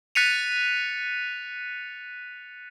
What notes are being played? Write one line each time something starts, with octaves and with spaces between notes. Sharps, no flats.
F#6 A6 B6 C#7 D#7 F7